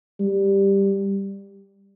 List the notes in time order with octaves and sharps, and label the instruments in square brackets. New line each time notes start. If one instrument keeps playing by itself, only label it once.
[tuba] G3